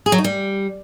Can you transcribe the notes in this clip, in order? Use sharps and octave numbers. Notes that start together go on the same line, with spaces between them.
G#4
F#3
D#4
G3